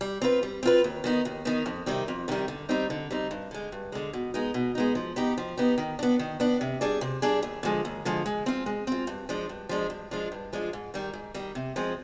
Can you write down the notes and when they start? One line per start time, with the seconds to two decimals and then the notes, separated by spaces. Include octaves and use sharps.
0.01 G3
0.22 C4 F4 B4
0.43 G3
0.63 C4 F4 B4
0.84 D#2
1.04 D#3 B3 D#4
1.25 D#2
1.45 D#3 B3 D#4
1.66 F2
1.86 C3 D#3 G3 C4
2.08 F2
2.28 C3 D#3 G3 C4
2.48 D3
2.69 G3 C4 D#4
2.90 D3
3.11 G3 C4 D#4
3.31 G2
3.51 D3 G#3
3.72 G2
3.92 D3 G#3
4.13 B2
4.34 G#3 B3 D#4
4.54 B2
4.75 G#3 B3 D#4
4.95 F3
5.16 B3 D#4 G4
5.38 F3
5.58 B3 D#4 G4
5.78 D#3
5.99 B3 D4
6.19 D#3
6.40 B3 D4
6.61 C3
6.81 G3 D4 G#4 D5
7.01 C3
7.22 G3 D4 G#4 D5
7.43 D#2
7.63 D3 F3 G#3
7.85 D#2
8.05 D3 F3 G#3
8.26 G#3
8.46 C4 F4
8.66 G#3
8.87 C4 F4
9.07 G2
9.29 F3 G#3 D4
9.49 G2
9.69 F3 G#3 D4
9.90 G2
10.11 F3 G#3 D4 F4
10.32 G2
10.53 F3 G#3 D4 F4
10.73 G#2
10.94 D#3 G3
11.14 G#2
11.34 D#3 G3
11.55 C3
11.76 F3 G#3 C4